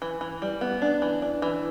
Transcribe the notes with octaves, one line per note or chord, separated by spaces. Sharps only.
E3
E3
G3
B3
D4
E3
D4
E3